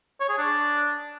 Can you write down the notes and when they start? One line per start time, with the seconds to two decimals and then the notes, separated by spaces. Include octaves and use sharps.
0.21 C#5
0.29 G#4
0.38 D4